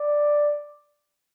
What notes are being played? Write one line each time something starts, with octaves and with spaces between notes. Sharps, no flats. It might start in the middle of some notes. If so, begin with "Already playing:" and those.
Already playing: D5